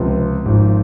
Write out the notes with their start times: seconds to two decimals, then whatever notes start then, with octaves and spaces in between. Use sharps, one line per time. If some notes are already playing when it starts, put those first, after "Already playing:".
Already playing: C#2 C3 F3
0.45 G#1 G#2 F3